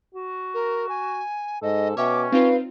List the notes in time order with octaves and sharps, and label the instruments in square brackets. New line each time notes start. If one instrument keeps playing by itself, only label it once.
[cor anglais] F#4
[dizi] A#4
G#5
[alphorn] G#2 [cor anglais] A4 [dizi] D#5
[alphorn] B2 [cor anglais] C#4 [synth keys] C#5 E5 G5 [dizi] D6
[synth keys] C4 D#4 F4 [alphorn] B4 [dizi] F5